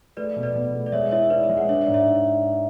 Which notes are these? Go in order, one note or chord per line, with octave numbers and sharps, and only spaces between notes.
A3 B4 D5
B2
B4 D5
B2
A3
D5
G#3 C#5 E5
E4 C#5 E5
E4 B4 D5
C#5
G#3
F#5
D4 C#5 E5
D5 F#5
G#2
C#5 E5